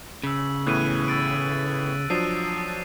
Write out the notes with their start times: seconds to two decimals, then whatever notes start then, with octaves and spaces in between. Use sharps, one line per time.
0.23 C#3 E6 B6
0.66 A2 E3 B3 F#6 D#7
1.08 E6 A6 D7
2.10 F3 F#3 D4 D#6 C7 D#7
2.58 D#6